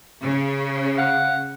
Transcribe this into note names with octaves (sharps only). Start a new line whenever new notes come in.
C#3
F5 F#5